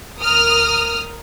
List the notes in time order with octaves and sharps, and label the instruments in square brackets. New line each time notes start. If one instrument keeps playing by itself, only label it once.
[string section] D2 A#4 D#6 F6